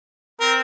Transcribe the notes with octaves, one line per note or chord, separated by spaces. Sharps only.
C4 A#4